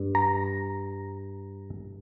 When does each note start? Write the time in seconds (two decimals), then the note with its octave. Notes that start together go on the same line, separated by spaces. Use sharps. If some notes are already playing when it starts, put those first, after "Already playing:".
Already playing: G2
0.15 A#5